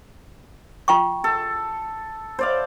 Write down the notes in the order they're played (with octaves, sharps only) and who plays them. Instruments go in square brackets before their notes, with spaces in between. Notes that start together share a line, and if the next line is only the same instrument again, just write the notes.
[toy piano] F4 G5 C#6
[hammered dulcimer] A4
C5 D5 F5